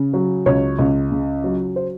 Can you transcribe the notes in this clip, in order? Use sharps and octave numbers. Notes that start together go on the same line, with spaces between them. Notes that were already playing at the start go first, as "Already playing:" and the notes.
Already playing: C#3
F#3
C#2 C#5
C#2
C#3
F#3
C5